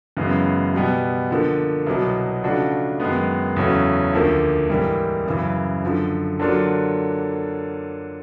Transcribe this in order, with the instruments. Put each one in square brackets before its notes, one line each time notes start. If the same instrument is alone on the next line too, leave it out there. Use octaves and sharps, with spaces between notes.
[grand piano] F#2 C#3 E3 G#3 B3
B2 G3 B3
D3 F3 A#3
C2 B2 F#3 B3
C#3 F3 A3 D4 F#4
F#2 D#3 G#3 B3
E2 C#3 F#3 A3 C#4
D2 D3 F3 A#3
G#2 E3 G3 A#3
F#2 C#3 E3
F#2 D3 F3
D3 F#3 A#3 D4 F4